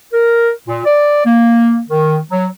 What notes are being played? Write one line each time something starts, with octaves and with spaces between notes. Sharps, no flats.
A#4
A#2
D5
A#3
D#3
F#3